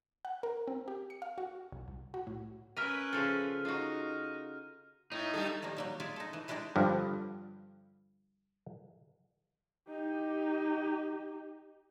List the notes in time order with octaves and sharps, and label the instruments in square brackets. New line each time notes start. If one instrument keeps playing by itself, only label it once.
[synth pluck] F#5
A#4
C4
G4
C#7
F5
F#4
B1
C2
F#4
A2
[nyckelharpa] C#4 B4 [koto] A#4 E5 [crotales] F6 D#7
[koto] C#3 F3 A4
[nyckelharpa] D#4 [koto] F4 F#4
[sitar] A2 [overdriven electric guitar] D#4
[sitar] G2 G3 A4
[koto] D#3 F3 G3 A#3
F#3 G3 A#3
G#3 F4 G#4 D5 E5 F5
D#4 A4
E3
E3 G3 G#3 D4 D#4
[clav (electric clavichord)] G2 D3 F3
[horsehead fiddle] D#4 G4